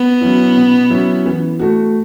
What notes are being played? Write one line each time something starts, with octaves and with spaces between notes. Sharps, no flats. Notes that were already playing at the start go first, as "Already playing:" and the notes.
Already playing: B3
F#3 C#4 E4
B2
F#3 C#4 E4
E3
A3 F#4